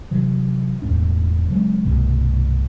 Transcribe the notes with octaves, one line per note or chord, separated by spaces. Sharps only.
C3 E3 F#3
E1 E2 A2 D4
C#3 F#3 G#3 C4
C2 G2 B2 A3